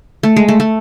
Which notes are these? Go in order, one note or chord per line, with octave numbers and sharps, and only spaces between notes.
A3
G#3
A3
A3